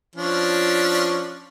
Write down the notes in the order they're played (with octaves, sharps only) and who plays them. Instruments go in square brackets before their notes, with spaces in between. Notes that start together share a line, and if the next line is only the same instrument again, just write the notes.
[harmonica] F3 C#4 D4